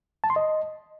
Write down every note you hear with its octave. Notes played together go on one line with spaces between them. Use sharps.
A5
C6
D#5